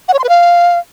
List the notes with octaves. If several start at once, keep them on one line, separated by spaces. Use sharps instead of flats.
F#5
C#5
C6
B4
F5